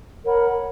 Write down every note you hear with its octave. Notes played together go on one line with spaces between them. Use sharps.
A#4 C#5 F#5 B5